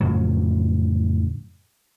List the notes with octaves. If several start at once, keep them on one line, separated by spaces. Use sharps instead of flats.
F2 A2 C#3 F#3